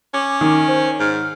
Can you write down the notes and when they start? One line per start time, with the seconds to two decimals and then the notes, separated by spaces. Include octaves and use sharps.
0.14 C#4 D6
0.41 D#3
0.68 C5
1.00 G#2 F6